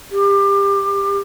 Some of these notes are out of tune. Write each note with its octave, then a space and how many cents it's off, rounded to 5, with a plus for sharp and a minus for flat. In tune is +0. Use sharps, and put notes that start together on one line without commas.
G4 +25